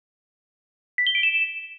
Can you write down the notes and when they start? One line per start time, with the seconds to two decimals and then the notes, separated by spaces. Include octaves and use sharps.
0.98 B6
1.07 G7
1.15 D7
1.23 E7